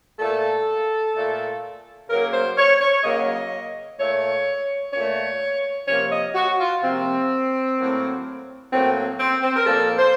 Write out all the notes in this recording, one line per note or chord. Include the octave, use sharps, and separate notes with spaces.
A#2 A3 A4
A#2 A3
C#3 F#3 A#3 A#4
C5
C#5
C#5
C#3 F#3 A#3 D#5
A#2 A3 C#5
A#2 A3 C#5
C3 F3 A#3 C#5
D#5
F#4
F4
C3 F3 A#3 C4
A2 F#3 A#3
A2 F#3 A#3 C4
C4
C4
A#4
A#2 F3 A#3 A4
C5